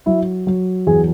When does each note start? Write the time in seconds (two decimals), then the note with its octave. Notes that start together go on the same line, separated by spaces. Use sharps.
0.06 F#3 E4
0.47 F#3
0.87 E2 G#4